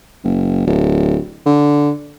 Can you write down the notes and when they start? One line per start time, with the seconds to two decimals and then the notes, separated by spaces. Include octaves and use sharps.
0.24 F#1
0.67 D1
1.46 D3